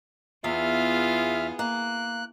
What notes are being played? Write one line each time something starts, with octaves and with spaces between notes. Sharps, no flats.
E2 B3 F4 G#4 E5 F6
A#3 F#6